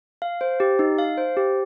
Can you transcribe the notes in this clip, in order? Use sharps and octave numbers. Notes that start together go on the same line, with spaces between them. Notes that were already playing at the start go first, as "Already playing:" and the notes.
F5
C5
G4
D#4
F5
C5
G4